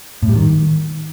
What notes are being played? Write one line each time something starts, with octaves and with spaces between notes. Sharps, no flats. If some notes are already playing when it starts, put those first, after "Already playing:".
A2
G3
D#3